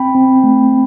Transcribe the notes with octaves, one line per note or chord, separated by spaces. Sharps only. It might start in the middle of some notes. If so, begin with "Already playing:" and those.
Already playing: C4 G5 B5
C4
A3